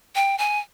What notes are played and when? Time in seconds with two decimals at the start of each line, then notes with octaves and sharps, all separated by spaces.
0.15 G5
0.38 G#5